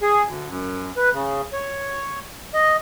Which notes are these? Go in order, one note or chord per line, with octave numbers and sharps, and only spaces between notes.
G#4
D2
F#2
B4
C#3
C#5
D#5